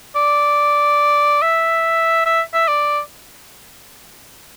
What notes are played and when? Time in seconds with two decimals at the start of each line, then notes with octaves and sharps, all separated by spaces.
0.16 D5
1.42 E5
2.26 E5
2.54 E5
2.68 D5